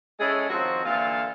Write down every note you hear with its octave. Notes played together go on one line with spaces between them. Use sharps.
G#3 C#4 E4 G#4 A4
D#3 F3 C4 F#4
A#2 D3 E3 F4 A4 F5